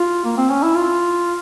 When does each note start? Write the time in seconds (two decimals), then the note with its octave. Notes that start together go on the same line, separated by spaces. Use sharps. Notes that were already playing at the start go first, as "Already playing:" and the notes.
Already playing: F4
0.25 A#3
0.37 C4
0.50 C#4
0.63 E4
0.76 F4